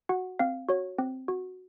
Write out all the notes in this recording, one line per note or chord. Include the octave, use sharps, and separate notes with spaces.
F#4 F#5
C4 F5
F#4 C#5
C4
F#4